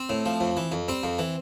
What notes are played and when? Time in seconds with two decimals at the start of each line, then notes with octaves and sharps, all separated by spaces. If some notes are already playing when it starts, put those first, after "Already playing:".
Already playing: C4
0.09 A2
0.26 F3
0.40 F2
0.57 E3
0.72 F2
0.88 G3 C4
1.03 F2
1.19 E3